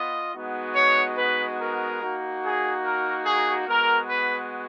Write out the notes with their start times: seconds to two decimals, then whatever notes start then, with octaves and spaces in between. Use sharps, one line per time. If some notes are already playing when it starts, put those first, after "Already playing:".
Already playing: B3 F4 D#5
0.34 G#3 B3 D#4 F#4
0.75 C#5
1.17 B4
1.59 A#4
2.01 A#3 D#4 F#4
2.42 G#4
2.83 A#4
3.26 G#4
3.66 G#3 B3 F#4 A#4
4.09 B4